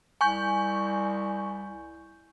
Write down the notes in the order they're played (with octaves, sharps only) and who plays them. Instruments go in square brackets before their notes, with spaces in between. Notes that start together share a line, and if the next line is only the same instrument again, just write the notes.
[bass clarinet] C2 [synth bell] G#5 C#6 G6